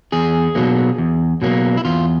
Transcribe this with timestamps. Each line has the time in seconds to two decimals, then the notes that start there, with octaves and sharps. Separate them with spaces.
0.12 E2 G#4
0.55 B2 F#3 A#3
0.98 E2
1.42 B2 F#3 A#3
1.77 E4
1.85 E2 F4